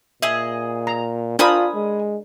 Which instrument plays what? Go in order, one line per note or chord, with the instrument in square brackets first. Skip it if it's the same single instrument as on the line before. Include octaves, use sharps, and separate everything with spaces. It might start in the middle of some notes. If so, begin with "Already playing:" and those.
[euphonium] A#2 [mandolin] G#4 D#5 [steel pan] E5
[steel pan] A#5
[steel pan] D4 A#4 C5 [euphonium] F4 [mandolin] G#5 B5 D#6
[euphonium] G#3